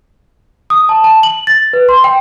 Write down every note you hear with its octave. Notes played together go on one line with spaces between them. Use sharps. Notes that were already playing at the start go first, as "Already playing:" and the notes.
D#6
A5
A5
F#7
A6
B4
C6
G5